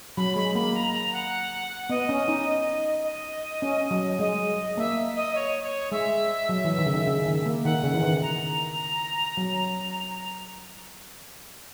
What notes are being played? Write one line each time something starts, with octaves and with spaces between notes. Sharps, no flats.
F#3 B5
G#3 B5
A#3 B5
A#5
A#5
F#5
B3 D#5
C#4
D#4
D#5
C#4
F#3
G#3 D#5
A#3 E5
D#5
C#5
C#5
G#3 E5
F#3
E3
D#3
C#3
D#3
C#3
D#3
A#3
D#3 F#5
C#3
E3
D#3
A#5
F#3